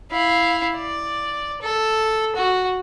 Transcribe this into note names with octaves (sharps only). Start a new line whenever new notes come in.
E4 F5
D5
A4
F#4